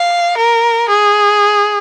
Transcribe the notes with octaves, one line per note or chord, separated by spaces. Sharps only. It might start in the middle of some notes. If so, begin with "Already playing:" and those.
Already playing: F5
A#4
G#4